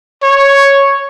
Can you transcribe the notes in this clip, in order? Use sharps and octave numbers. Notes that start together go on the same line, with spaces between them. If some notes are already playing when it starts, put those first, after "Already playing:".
C#5